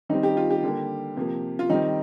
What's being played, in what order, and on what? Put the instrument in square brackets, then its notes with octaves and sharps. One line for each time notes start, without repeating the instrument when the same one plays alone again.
[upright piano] D#3 G3 C4 D#4
G4
F4
G4
D3 G3 A#3
C3 F3 A#3
F4
D#3 G3 C4 D#4